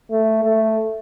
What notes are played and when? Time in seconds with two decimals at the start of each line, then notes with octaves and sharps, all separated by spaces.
0.10 A3
0.44 A3